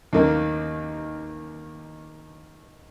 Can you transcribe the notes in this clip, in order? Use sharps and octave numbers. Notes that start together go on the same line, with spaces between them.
D#2 D#3 A#3 D#4